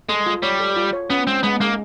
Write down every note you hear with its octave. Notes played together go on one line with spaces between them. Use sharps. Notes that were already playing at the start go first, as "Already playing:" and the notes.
G#3 A4
F4
G3 C#5
A4
F4
C#5
B3 C#4
G#3 C4
G#3 B3
G#3 A#3